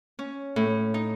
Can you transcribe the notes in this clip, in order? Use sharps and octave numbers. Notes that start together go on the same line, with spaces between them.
C#4
A2
D#4